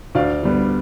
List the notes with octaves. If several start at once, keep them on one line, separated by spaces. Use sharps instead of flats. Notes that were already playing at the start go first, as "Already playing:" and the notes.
D2 D5 F5
D3 G3 B3